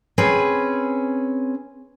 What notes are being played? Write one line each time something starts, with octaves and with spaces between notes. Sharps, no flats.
C4 C#4 G#4 B4